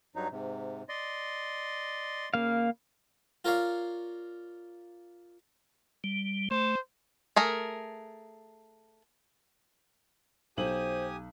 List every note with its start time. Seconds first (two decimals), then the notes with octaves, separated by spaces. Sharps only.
0.16 G2 F#3 D#4
0.32 G#2 C3
0.89 D5 D#5 C6
2.34 C#3 A#3 F5
3.45 F4 A#4 C#5 D5 F5
6.04 G3
6.51 A3 C5
7.36 A3 G#4 A#4
10.57 B1 G4 C5 G#5 D#6 F#7